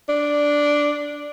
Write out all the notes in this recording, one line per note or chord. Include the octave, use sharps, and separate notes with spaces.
D4